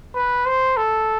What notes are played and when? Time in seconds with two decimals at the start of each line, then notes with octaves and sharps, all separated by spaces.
0.15 B4
0.46 C5
0.77 A4